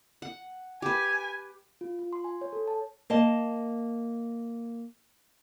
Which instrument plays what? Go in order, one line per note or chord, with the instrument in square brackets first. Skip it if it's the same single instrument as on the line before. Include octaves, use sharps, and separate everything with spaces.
[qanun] F#5
[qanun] G4 B4 [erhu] G#5
[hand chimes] F4
F4
C6
G#5
C#5
A4
A5
[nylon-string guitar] A#3 D#5 A5